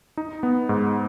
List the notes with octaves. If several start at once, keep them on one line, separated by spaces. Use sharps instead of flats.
D#4
B3
G#2